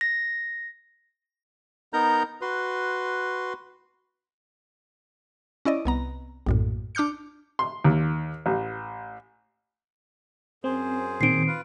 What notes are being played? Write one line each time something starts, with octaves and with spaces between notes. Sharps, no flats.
A#6
B3 D#4 A#4 A#5 G6
F#4 B4 C6
C#4 E4 D5 D#5
C2 B3 A#5
A#1 F#2 A2
D4 D6 F6 G6 C#7
C6
D#2
A1
F#2 C4 G#4 C5
A#2 D#3 C4 C7 D7
F4 B4